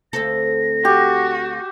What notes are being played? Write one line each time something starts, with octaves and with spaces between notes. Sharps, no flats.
D2 C4 A4 A#6
F#4 G4